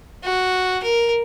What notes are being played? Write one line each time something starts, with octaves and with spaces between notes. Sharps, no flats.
F#4
A#4